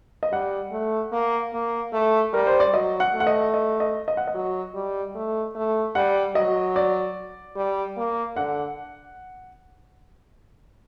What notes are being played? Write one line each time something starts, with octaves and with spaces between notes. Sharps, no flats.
D#5
G3 F#5
A3
A#3
A#3
A3
G3 A#4
C5
D5
F#3 D#5
F#5
A3
F#5
D#5
D#5
D#5
D#5
F#5
D#5
F#3
G3
A3
A3
G3 F#5
F#3 D#5
D5
G3
A#3
D3 F#5